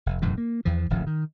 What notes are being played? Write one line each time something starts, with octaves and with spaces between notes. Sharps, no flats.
F1
E1 F#2 A2 E3
A#3
E2 E3 F3
D1 G#1 C#3 F3
D#3